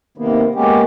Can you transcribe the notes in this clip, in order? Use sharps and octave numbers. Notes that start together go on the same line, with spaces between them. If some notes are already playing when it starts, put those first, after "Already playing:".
C3 D#3 A#3 B3
G#3 A#3 B3 C#4 G4